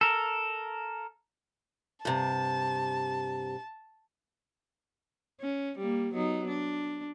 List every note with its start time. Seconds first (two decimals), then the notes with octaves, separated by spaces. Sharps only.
0.01 A4 A#4
2.05 G2 C3 A5
5.41 C#4
5.78 G3 A#3
6.14 F#3 B3 D#4
6.48 D4